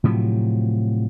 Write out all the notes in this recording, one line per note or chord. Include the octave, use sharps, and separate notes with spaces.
A2 C3 F3 F#3